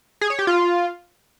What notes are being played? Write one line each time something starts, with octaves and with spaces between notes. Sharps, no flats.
G#4
C#5
G4
F4